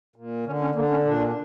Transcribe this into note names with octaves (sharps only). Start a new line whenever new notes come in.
A#2
D3 C#4
C#4
D3 A#3
C#4
A#2 D4